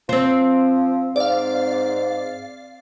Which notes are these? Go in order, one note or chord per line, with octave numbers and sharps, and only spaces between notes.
F3 C4 C5
G#2 D5 F5